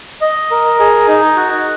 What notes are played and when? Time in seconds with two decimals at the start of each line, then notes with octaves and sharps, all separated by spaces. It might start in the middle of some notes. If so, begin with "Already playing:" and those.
0.21 D#5
0.51 A#4
0.80 G#4
1.08 D#4
1.36 F#4